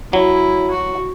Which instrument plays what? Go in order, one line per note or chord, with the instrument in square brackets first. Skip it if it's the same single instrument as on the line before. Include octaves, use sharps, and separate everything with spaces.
[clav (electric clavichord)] F#3 [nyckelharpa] E4
[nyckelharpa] F#4